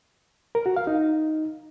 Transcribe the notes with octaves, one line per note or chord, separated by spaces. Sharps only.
A#4
F#4
F5
D#4